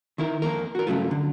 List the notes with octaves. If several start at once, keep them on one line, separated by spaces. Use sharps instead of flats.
D#3 E4 A#4
F2 A#3 A#4
F#4 A#4
G2 C#3 F3 F#3 A3 F4
D3